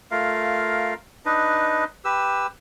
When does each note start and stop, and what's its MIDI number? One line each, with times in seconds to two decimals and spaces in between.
0.11 0.94 57
0.11 0.94 65
0.11 0.94 70
0.11 0.94 77
1.25 1.84 62
1.25 1.84 63
1.25 1.84 71
1.25 1.84 75
2.05 2.47 67
2.05 2.47 71
2.05 2.47 88